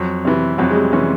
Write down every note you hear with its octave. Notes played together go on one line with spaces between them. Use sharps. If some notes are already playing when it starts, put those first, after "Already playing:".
Already playing: F2 F#3
C3 E3
F2 F#3
G#3
G3
C3 E3 C#4